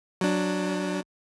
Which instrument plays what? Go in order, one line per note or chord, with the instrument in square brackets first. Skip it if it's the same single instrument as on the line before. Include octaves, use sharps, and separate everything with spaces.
[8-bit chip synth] F#3 D4